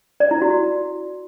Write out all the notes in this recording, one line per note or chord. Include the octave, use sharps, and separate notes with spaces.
D5
E4
F#4